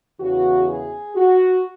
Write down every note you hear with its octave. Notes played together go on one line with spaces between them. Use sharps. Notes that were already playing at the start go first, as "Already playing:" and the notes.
E2 C#3 E3 F#4
G#4
F#4